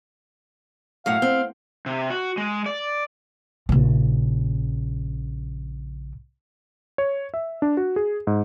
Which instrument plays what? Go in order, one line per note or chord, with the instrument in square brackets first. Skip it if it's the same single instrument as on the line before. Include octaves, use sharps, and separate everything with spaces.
[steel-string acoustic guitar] F#2 A2 F#5 [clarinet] F5
[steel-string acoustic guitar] C4
[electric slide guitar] C3
F#4
G#3
D5
[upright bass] A#1 C#3
[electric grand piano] C#5
E5
D4
F#4
G#4
G#2